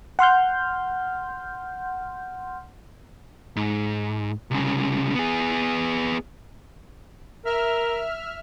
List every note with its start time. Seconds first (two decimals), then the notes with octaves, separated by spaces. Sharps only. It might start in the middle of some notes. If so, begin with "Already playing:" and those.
0.19 F#5 C6 F6 G6
3.56 G#2
4.51 C2 C#3
5.15 B3 G#4
7.45 A#4 E5 F6